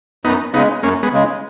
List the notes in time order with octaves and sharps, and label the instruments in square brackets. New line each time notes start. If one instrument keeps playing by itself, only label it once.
[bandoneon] F#2 [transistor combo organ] B3 D#4
[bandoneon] C#3 [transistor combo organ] B3 D#4
[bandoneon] G#3
[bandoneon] F#2 [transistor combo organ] A#3 C#4
[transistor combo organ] G#3 B3
[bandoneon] C#3 G#3